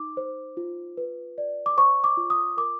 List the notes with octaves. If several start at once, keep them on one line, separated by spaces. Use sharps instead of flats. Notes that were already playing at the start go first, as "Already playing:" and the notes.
Already playing: D#4 D6
C5
F4
B4
D5
D6
C5 C#6
D6
F4
D#6
A#4 D6